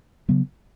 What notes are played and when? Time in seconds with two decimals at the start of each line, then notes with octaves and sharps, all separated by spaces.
0.29 C#3 F#3 B3